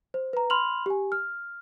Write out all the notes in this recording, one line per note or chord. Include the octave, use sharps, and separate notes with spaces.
C5
B4 A#5
B5 C6 F6 F7 F#7
G4 G#5
F6